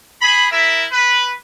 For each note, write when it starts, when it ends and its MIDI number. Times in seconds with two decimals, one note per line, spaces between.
0.22 0.49 68
0.22 0.49 83
0.51 0.85 64
0.51 0.85 70
0.51 0.85 76
0.92 1.31 71